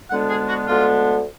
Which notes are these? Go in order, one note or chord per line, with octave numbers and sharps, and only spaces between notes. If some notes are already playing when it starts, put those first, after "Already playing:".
D2 D3 G#3 B3 D4 F#5
G#4
F#4
D2 D3 G#3 B3 D4 F4